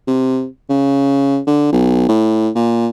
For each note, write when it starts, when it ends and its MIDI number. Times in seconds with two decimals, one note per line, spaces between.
0.07 0.46 48
0.69 1.39 49
1.47 1.71 50
1.72 2.08 35
2.09 2.49 45
2.55 2.88 46